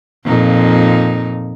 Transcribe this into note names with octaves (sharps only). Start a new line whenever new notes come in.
F2 A#2 D#4